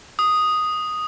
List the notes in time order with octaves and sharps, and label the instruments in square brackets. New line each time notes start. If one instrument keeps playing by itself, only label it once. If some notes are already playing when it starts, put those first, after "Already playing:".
[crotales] D#6